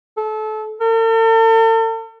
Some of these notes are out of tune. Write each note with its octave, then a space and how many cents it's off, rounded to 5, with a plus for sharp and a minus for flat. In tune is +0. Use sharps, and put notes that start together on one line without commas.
A4 -25
A4 +45